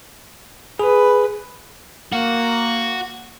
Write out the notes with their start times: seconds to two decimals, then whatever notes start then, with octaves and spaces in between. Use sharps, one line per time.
0.79 G#4 B4
2.12 A#3 F#4